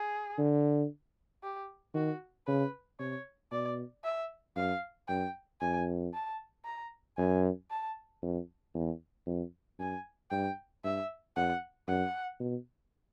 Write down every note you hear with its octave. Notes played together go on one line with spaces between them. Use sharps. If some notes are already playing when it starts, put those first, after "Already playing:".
Already playing: G#4
D3
G4
D#3 F#4
C#3 B4
C3 C#5
B2 D5
E5
F#2 F5
F#2 G5
F2 G#5
A5
A#5
F#2 G#5
A5
F2
E2
F2
F#2 G#5
G2 G5
G2 E5
F2 F#5
F#2 F#5
B2